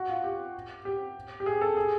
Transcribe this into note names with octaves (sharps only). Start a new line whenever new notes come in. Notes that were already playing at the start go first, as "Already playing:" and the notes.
Already playing: F#4
F4
G4
G4
G4
G#4
A4
G#4